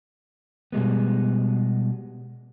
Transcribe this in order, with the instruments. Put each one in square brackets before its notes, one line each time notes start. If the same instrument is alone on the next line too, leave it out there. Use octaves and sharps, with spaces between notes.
[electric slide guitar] B2 G3 G#3 B3